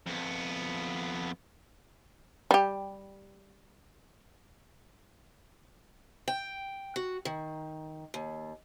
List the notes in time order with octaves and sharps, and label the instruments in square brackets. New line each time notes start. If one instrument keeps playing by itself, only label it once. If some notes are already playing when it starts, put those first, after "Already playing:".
[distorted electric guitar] F2 B3
[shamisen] G3 G4
[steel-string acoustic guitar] G5
F#4
D#3
D#2